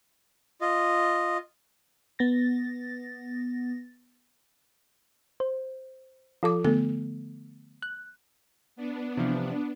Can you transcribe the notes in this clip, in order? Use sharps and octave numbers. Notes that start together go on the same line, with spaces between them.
F4 D#5
B3 A6 A#6
C5
F3 F4 A4 D6
D3 A3 B3 A4
F#6
B3 D4
C3 E3 F3